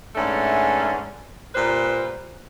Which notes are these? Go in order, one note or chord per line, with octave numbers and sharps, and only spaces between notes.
G#2 E3 A3 C#4 D4
A#2 G3 B4 C5